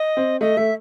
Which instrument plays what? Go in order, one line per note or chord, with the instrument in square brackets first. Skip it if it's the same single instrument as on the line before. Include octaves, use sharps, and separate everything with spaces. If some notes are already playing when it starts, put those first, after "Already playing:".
Already playing: [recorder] D#5
[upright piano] C4
[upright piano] A3 [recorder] D#5
[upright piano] A3 [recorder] E5